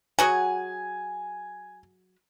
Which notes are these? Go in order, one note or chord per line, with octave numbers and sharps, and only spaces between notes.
F#3 F#4 G#4 G#5